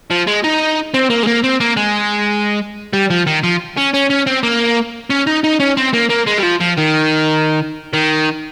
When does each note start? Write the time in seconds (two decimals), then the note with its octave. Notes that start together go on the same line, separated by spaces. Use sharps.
0.10 F3
0.27 G#3
0.44 D#4
0.94 C4
1.10 A#3
1.23 G#3
1.27 A#3
1.44 C4
1.60 A#3
1.77 G#3
2.93 G3
3.10 F3
3.27 D#3
3.43 F3
3.77 C#4
3.94 C#4
4.10 C#4
4.27 C4
4.43 A#3
5.10 C#4
5.27 D#4
5.44 D#4
5.60 C#4
5.77 C4
5.93 A#3
6.10 A#3
6.27 G#3
6.38 G3
6.43 F3
6.60 F3
6.77 D#3
7.93 D#3